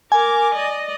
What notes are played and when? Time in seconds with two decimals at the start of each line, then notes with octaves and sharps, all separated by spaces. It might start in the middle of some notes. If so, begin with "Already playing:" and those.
0.12 A#4 G#5 D6
0.54 D5 D#5